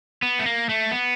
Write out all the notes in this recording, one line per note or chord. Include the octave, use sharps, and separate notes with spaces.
B3
A3
A#3
A3
B3